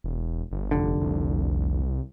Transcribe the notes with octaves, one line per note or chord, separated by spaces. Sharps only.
E1
G1
F1 D3
C2